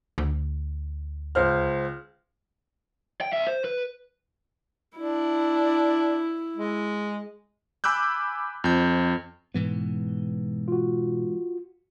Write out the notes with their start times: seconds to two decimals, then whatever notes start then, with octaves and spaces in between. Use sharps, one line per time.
0.18 D2
1.35 C#2 C5 F6
3.21 G5
3.33 C2 E5
3.47 C5
3.65 B4
4.97 D4 E4
6.56 G#3
7.84 G#5 B5 D6 E6 F#6 G6
8.64 F2 G6
9.54 G#2 B2 E3 B3
10.68 F4 F#4